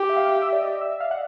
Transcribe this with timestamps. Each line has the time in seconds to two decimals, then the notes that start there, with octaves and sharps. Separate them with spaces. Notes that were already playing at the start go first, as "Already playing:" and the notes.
Already playing: G4 G5
0.09 E5
0.16 F5
0.42 E5
0.52 D5
0.61 D#5
0.81 E5
0.92 E5
1.00 F5
1.11 F#5